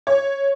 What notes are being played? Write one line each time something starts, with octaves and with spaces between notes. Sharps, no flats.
C#5